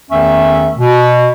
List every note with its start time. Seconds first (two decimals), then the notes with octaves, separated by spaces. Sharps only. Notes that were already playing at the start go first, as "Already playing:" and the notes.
0.10 E2 D#3 A3 C#4 E5
0.77 B2